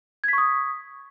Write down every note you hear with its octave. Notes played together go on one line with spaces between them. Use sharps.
C#6 D#6 G#6 B6